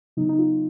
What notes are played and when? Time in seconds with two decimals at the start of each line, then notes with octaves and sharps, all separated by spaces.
0.17 C#3 F#3 B3 D#4
0.29 D#4
0.39 F4